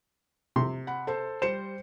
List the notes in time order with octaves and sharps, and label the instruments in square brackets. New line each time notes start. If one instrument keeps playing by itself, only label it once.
[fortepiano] C3 C6
[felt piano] F#5 B5
A4 C5 A5
[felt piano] G3 C#7 E7 [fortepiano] C5